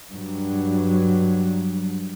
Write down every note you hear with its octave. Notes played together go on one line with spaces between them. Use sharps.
G2 F#3